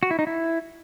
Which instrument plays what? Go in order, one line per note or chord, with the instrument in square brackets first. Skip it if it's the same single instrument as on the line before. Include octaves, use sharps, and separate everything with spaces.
[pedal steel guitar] F#4
E4
D#4
E4